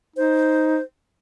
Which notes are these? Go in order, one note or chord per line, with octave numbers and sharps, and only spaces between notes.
D#4 C5